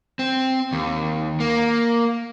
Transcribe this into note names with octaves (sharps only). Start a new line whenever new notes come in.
C4
D#2
A#3